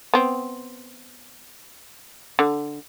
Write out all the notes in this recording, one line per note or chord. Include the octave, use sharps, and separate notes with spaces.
B3 C4
D3